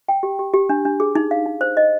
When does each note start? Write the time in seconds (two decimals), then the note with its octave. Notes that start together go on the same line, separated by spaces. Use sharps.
0.09 G5
0.23 G4
0.39 G4
0.54 G4
0.69 D4
0.85 D4
1.00 G#4
1.15 D#4
1.31 F5
1.46 D#4
1.61 C5
1.77 D#5